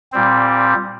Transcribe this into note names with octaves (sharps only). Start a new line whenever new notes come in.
A#2 G3 C4